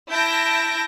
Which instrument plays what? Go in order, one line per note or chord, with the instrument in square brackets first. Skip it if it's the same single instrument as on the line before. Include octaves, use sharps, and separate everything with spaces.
[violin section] E4 A5 G6 A#6 D7